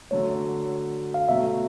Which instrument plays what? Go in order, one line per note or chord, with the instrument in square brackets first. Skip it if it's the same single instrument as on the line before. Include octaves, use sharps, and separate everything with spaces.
[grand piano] D3 F#3 A3 [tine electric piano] C#5
[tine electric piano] F5
[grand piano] B2 F#3 A3 [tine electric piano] E5